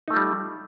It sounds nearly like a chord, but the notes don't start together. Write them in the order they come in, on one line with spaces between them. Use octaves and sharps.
D#4 A3 F4 G3